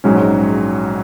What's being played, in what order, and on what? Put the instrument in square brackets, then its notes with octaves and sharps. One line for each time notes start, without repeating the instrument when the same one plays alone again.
[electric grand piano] A#1 G#2 F#3 C#4 [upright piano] G#3